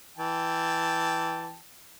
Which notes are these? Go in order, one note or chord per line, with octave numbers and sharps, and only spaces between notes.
E3 G5 A5